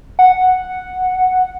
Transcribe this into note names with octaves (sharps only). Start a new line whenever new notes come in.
F#5